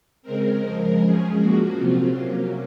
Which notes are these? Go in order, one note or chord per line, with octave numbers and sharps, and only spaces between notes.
C#3 G#3 C4 A#4
F2 C#3 F3 G#3 A#4
F#2 F3 G#3 C#4 G#4
A#2 F3 A#3 C#4 F#4
C3 F#3 C4 F4
C3 F#3 A#3 C#4